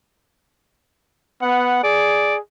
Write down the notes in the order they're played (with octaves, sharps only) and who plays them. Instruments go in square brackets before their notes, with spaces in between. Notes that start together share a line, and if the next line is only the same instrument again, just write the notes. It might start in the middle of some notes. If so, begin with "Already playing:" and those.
[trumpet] B3 [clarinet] F#5
[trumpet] G#4 [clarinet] D5